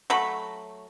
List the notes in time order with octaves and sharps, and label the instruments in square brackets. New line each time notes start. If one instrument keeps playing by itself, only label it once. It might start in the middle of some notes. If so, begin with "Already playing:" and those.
[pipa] F#3 A3 B5